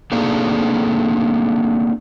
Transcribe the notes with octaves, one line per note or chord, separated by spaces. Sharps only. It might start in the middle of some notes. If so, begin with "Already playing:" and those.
A3 A#3 C4 D4 D#4 G#4